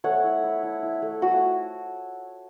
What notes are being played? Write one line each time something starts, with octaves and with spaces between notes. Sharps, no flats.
A3 C#5 F#5
E4
E4
E4
E4
A3
A3 F#4